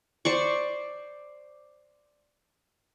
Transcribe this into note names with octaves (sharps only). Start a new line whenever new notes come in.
C5 D5 C#6